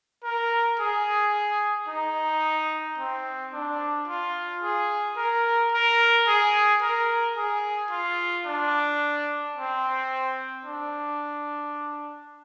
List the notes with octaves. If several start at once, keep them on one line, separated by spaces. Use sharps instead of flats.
A#4
G#4
D#4
C4
D4
F4
G#4
A#4
A#4
G#4
A#4
G#4
F4
D4
C4
D4